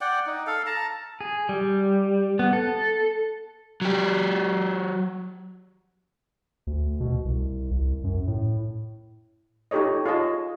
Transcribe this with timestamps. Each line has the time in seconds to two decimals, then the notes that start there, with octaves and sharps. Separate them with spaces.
0.01 D5 F#5 G5
0.26 D#4
0.47 A4 F5
0.66 A5 A#5
1.21 G#4
1.49 G3
2.39 B3
2.53 A4
3.81 F#3 G4
6.67 D2
7.01 B2
7.25 C2
7.71 C2
8.04 F#2
8.27 A2
9.71 D#4 F4 G4 A4 C#5 D#5
10.06 F4 G#4 C#5 D#5 A5